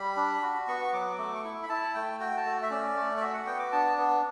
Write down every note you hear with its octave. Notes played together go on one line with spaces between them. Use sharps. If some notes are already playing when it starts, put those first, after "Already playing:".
Already playing: G3 B5
D4
F#4
B3 C#6
F#3 D6
A3 D6
C#6
E4
B5
E4 A5
A3 G5
F#4 G5
A5
A3
E5
C#4 D5
A3
D5
F#4 E5
F#5
B3 G5
D6
D4 A5
B3